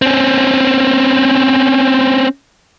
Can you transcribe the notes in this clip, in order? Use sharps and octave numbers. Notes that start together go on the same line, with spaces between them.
C4 C#4